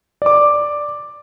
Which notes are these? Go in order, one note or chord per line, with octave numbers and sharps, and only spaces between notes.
D5 D6